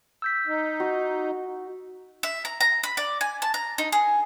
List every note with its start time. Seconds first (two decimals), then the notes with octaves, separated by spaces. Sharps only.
0.22 E6 G6 B6
0.47 D#4
0.80 F#4
2.23 E5
2.45 A#5
2.61 A#5
2.83 B5
2.97 D5
3.21 G#5
3.42 A5
3.54 A#5
3.78 D#4
3.92 G#4